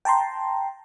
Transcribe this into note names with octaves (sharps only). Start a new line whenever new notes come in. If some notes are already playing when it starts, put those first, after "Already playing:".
G5 A5 A#5 C6